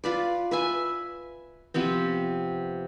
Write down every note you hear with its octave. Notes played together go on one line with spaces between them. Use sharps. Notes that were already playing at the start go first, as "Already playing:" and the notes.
F4 B4 D5
B4 E5 G#5
C3 F3 B3 C4